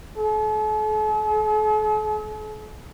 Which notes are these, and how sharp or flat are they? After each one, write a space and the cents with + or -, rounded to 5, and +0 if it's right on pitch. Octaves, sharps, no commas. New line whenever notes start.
A4 -45